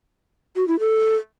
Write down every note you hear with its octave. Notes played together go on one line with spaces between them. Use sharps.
F#4
E4
A4